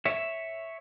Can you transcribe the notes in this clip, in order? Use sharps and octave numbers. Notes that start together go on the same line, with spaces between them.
C#5 E5